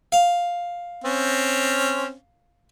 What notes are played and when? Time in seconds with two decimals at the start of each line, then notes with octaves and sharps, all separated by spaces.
0.12 F5
1.04 C4 C#4